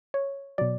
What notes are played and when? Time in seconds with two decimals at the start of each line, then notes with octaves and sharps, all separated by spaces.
0.14 C#5
0.58 B2 F#3 D5